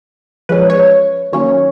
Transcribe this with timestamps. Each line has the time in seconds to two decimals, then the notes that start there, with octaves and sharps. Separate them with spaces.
0.49 F3 G#3 C#4 B4
0.70 C#5
1.33 D#3 F#3 A#3 C#4 C#5